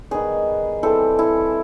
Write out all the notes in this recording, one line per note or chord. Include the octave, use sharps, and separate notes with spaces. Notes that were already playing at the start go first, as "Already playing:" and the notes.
D#3 G3 B3 G#4
E3 G3 C4 A4
E4